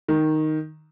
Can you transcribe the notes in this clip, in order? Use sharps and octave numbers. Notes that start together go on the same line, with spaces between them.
D#3